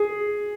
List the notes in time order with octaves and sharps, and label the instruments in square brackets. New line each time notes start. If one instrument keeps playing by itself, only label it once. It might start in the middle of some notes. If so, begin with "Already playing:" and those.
Already playing: [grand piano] G#4